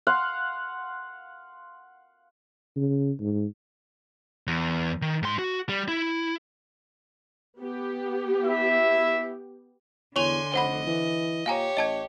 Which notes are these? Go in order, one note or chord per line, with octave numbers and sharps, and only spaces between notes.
F5 F#5 C6
C#3
G#2
E2
D#3
G#2 C6
F#4
G3
E4
B3 G4
E4 E5
E2 D3 C#5 G#5 C6 C#6 F7
F1 C5 D#5 F#5 B5
E3
A#2 G4 C#5 F5 G#5 A#5
A1 D#5 A5 G#6